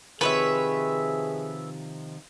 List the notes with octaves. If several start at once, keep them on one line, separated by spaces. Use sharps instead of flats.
C3 D#3 F3 G#4 B4 C#5 E5